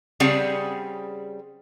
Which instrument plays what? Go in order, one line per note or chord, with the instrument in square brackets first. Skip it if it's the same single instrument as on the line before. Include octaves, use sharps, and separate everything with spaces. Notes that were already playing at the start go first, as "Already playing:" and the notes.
[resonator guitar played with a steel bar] C#3 G3 C4 G#4 F#5